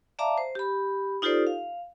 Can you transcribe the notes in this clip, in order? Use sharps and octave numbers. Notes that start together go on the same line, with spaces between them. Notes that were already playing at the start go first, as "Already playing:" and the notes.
D5 E5 F5 A5 A#5 D6
C5
G4 B5
D#4 F4 G4 A4 C5 D5
F5